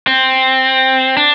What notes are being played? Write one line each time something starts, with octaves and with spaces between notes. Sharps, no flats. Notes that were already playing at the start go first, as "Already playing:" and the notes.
C4
D4